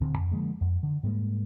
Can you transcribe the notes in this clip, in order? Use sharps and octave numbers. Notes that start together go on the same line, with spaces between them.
D1 D3 C4
F2
D3 F3 G#3 A#3
F2
D3
G#2 G3 G#3 A#3